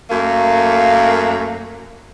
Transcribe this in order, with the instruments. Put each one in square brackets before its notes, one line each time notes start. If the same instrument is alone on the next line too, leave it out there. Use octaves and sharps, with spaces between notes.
[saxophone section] F#2 A3 A#3